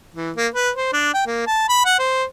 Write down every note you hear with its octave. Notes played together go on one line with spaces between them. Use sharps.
E3
A#3
B4
C5
D4
G5
A#3
A5
B5
F#5
C5